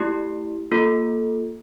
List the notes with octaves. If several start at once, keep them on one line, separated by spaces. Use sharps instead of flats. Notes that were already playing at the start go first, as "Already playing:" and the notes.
Already playing: A3 E4 G4
A#3 F4 A4